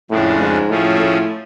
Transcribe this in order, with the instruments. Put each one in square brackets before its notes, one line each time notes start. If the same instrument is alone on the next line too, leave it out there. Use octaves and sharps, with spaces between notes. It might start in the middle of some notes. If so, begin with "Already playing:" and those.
[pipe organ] F2 C#3 G#3 D4 G#4 [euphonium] A2
[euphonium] G#2
[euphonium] A2 [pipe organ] F3 A3 C#4 G#4
[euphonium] A2